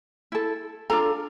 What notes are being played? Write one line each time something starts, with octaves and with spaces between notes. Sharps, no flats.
E4 A4
D4 F4 A4 A#5